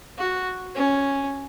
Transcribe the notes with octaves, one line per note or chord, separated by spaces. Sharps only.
F#4
C#4